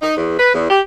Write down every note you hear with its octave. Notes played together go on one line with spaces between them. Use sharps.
D#4
E2
B4
E2
G4